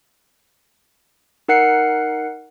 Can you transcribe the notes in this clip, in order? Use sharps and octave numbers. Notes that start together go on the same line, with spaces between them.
D#4 A#4 F#5 F#6 C7 C#7